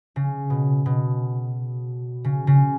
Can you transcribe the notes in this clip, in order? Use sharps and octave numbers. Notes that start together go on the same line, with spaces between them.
C#3
B2
B2
C#3
C#3